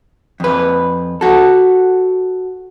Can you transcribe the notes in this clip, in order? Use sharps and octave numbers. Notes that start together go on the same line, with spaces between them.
F2 B4
F#4 A4